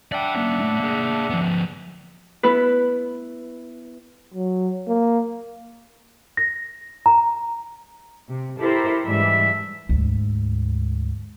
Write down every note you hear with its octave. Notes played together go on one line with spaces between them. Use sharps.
D4 D5 E5 F#5 G5
A#3 C#4
A2
A#3 G#4
F3 B3
B3 E4 B4
F#3
A#3
A#6
A#5
C3
E4 G4 A4 A#4 C5
G#2 E3 G3 D4 E5
D2 G#2